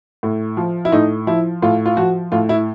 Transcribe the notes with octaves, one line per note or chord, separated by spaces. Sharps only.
A2
F3
E4
A2 D#4
F3 E4
A2 F4
F4
F3 F#4
A2 F4
E4